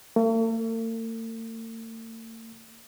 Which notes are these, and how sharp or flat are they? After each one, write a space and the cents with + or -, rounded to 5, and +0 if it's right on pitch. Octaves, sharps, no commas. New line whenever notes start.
A3 +45